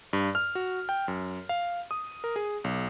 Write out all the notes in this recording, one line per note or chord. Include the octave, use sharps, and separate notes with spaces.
G2
F6
F#4
G5
F#2
F5
D#6
A#4
G#4
B1